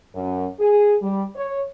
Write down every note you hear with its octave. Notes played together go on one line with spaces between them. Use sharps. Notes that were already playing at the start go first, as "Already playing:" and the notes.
F#2
G#4
G3
C#5